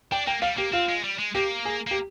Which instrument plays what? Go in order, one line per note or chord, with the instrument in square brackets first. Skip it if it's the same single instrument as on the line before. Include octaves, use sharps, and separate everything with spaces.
[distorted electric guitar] D4 [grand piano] G5
[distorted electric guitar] A#3 [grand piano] G5
[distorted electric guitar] G3 [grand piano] F5
[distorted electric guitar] A#3 [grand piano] G4
[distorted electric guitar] C4 [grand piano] F4
[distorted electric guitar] G#3
G3
G#3
[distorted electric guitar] A#3 [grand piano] G4
[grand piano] G#4
[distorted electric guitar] A#3
[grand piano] G4